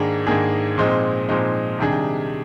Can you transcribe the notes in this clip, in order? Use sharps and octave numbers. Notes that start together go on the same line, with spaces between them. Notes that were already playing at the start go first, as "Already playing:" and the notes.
Already playing: G#2 D#3 A#3 D4 G#4
G#2 D#3 A#3 D4 G#4
A#2 F3 G#3 C4 D#4
A#2 F3 G#3 C4 D#4
C3 D#3 G3 D4 G#4